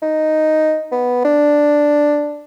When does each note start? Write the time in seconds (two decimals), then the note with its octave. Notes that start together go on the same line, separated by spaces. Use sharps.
0.02 D#4
0.92 B3
1.25 D4